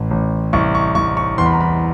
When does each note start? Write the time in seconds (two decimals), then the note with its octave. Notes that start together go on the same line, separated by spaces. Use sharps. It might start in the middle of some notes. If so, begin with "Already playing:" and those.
Already playing: A1
0.11 A1
0.53 C2 C#6
0.75 C#6
0.95 C2 C#6
1.17 C#6
1.38 E2 C6
1.46 B5
1.53 A#5
1.61 B5